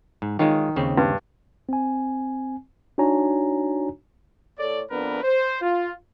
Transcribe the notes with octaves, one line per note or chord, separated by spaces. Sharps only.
G#2
D#3 G#3 F4 C#5
D#2 C#3 C4
G2
C4 G#5
D4 D#4 F#4 C#5 G#5 A#5
A2 A4 C#5 D5
F2 B3 D4 A#4 B4
C5
F4